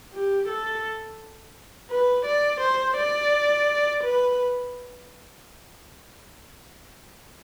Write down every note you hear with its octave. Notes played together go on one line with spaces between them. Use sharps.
G4
A4
B4
D5
C5
D5
B4